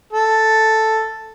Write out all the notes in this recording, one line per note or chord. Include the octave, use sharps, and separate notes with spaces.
A4